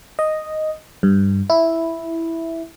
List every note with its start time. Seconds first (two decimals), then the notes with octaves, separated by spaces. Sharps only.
0.19 D#5
1.03 G2
1.50 E4